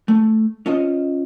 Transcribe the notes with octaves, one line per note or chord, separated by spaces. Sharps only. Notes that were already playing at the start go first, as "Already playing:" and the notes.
A3
C#4 F4 C5 D#5